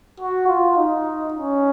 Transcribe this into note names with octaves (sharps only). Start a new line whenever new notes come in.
F#4
F4
D#4
C#4